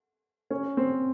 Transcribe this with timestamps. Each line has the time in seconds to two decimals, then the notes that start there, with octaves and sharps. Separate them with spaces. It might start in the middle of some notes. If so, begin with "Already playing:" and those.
0.51 C#4
0.77 C4